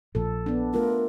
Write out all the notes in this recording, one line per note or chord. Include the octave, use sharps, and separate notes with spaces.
A#1 A#2 F3 A4
B3 D4
A3 F4 A#4